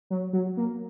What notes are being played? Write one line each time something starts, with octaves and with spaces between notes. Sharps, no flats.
F#3
F#3
A#3